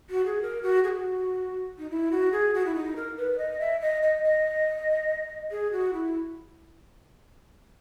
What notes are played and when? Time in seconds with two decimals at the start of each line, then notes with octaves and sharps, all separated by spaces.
0.10 F#4
0.26 G#4
0.42 A#4
0.63 F#4
0.84 G#4
0.88 F#4
1.79 D#4
1.90 E4
2.11 F#4
2.32 G#4
2.54 F#4
2.66 E4
2.75 D#4
2.96 A#4
3.17 B4
3.38 D#5
3.60 E5
3.81 D#5
4.02 D#5
4.23 D#5
5.51 G#4
5.72 F#4
5.93 E4